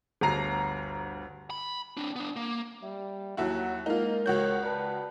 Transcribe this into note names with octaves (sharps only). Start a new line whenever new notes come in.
G1 D2 A#5 C7
B5
C4 D4
B3 D4
A#3
G3 E5
D#2 F#3 E4 F#4
G#3 A#3 D#4 F4 A#4
C#2 F#4 C#5 G6
B4 D5 A5